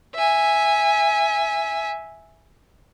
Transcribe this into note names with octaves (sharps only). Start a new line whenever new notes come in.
E5 G#5